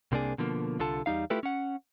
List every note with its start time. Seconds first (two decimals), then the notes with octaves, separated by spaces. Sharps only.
0.12 C2 C3 A#3 D4 G#4
0.38 B2 D3 F3 A#3
0.79 C2 D3 F4 A4 A5
1.06 E2 G3 D#4 F5
1.30 A3 E4 F4 G4 A4 B4
1.43 C#4 F#5